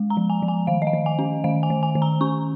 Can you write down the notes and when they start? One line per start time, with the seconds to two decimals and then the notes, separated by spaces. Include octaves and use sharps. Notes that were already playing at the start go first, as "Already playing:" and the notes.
Already playing: G#3
0.10 A#5
0.17 F3
0.30 G#5
0.42 F3
0.48 G#5
0.67 D#3 F5
0.82 D#5
0.87 F5
0.93 D#3
1.06 G#5
1.19 C#4
1.44 D#3 F5
1.63 G#5
1.70 D#3
1.83 G#5
1.95 D#3
2.02 A#5
2.21 C#4 C#6